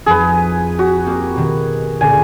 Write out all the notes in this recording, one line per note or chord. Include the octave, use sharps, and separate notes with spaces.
F2 F3 D#4 G#4 B4
F#4
A#3 C4 G4
B2 D#3
C#2 A#2 D3 G#5